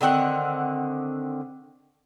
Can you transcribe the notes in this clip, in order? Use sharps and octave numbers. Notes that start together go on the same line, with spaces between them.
D3 D#3 C4 F#5